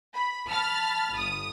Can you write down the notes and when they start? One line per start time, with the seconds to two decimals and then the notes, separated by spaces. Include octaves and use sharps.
0.13 B5
0.50 A5 B5 F6 A6
1.16 G1 D#6